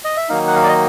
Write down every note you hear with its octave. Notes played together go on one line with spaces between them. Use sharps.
D#5
E5
D#3 F#3 A#3 D#4 F5
F#5
F5
D5
D#5